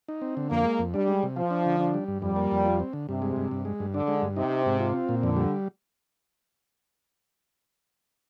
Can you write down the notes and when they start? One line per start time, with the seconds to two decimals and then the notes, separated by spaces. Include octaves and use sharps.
0.08 D#4
0.22 C4
0.37 D3
0.50 F2 A#3
0.65 G#3
0.79 F2
0.94 G3 D4
1.08 G#3
1.23 C3
1.36 F3 F4
1.51 D4
1.66 D3
1.80 D4
1.94 G3
2.08 G2
2.22 F2 G3
2.36 A#3
2.51 F2
2.66 F4
2.80 C4
2.93 D3
3.09 G2 C3
3.22 G#3
3.36 G2
3.51 G2
3.65 G#3
3.80 G2
3.94 D3 D4
4.08 G#3
4.22 G2
4.36 C3 D#4
4.51 C4
4.66 G#2
4.80 F4
4.94 C4
5.09 A#2
5.23 F2 D3
5.36 G3